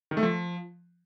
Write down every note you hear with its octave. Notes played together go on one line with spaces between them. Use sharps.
D#3
A3
F3